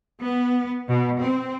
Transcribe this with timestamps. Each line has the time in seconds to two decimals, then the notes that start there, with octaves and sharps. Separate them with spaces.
0.24 B3
0.88 B2
1.22 C4